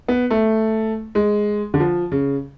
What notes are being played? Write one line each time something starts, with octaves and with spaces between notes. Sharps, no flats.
B3
A3
G#3
D3
F3
C#3